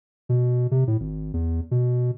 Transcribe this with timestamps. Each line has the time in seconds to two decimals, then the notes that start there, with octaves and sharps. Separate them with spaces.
0.29 B2
0.71 C3
0.87 A2
1.00 G#1
1.33 E2
1.71 B2